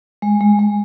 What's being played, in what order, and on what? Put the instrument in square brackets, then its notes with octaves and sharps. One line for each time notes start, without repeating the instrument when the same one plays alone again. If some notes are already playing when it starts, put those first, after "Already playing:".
[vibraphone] G#3
G#3
G#3